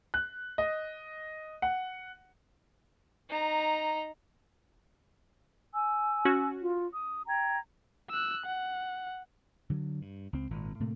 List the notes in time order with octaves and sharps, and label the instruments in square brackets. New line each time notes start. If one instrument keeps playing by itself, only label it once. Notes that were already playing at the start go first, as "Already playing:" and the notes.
[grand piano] F#6
D#5
F#5
[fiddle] D#4 A#5
[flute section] G#5 E6
[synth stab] C#4 F#4
[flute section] F4
D#6
G5 A#5 G#6
[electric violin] E6 F#6
F#5
[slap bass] D3 F#3
G2
C#2 C4
G#1 A#2
A2 C3 A3 A#3